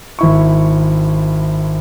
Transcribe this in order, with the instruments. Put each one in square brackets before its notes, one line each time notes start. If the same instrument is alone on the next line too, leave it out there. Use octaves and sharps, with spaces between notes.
[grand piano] G#1 E4 C#6